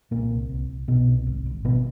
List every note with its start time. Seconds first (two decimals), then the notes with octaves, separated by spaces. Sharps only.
0.11 C2 A#2 A#3
0.31 C2
0.50 C2
0.69 C2
0.88 C2 B2 B3
1.07 C2
1.27 G#1
1.46 G#1
1.65 G#1 B2 B3